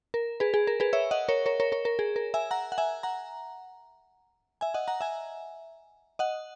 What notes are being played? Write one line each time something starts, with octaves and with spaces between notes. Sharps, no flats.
A#4
G#4 B4
G#4
A#4
G#4 B4
C#5 E5
D#5 F#5
A#4 C#5
A#4 C#5
A#4 C#5
A#4 C#5
A#4
G#4
A#4
E5 G#5
F#5 A#5
F#5
E5 G#5
F#5 A#5
E5 G#5
D#5 F#5
F#5 A#5
E5 G#5
D#5 F#5